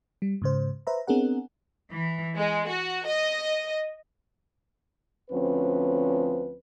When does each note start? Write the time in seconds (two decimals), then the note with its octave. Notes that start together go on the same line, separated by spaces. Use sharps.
0.22 G3
0.42 G#2 C#3 C5
0.87 B4 C5 E5 A#5
1.07 B3 C4 D4 G#4 A#4 F#5
1.91 E3
2.36 G#3
2.69 F#4
3.06 D#5
5.30 D2 F3 C4 C#4 B4